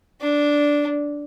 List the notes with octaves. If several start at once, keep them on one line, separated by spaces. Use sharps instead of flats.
D4